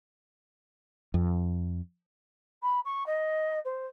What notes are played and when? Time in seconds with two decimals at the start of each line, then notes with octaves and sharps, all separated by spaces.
1.14 F2
2.62 B5
2.85 C#6
3.06 D#5
3.65 C5